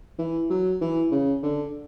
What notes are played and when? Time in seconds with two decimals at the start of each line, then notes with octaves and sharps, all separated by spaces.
0.19 E3
0.50 F#3
0.81 E3
1.11 C#3
1.43 D3